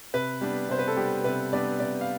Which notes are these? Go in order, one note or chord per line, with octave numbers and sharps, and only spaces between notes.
C3 B4
G3 B3 D4
C3 C5
B4
A4
G3 B3 D4 G4
C3 B4
G3 B3 D4 D5
C3 D5
F5